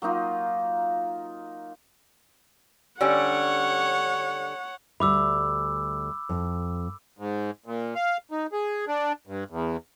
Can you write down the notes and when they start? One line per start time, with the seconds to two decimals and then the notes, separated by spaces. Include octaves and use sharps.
0.02 F#3 A#3 D#4 F4
3.01 D3 G3 C#4 C#5 F#5
5.00 D2 G3 E5 B5 D6 E6
6.29 F2
7.19 G#2
7.66 A#2
7.95 F5
8.31 D#4
8.52 G#4
8.88 D4
9.27 G2
9.50 E2